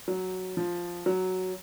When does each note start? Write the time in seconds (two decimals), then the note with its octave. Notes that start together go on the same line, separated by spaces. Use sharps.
0.08 F#3
0.57 F3
1.06 F#3